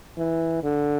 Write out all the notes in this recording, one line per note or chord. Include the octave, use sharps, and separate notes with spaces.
E3
D3